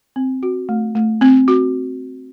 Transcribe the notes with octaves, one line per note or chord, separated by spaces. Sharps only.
C4
F#4
A3
A3
C4
F#4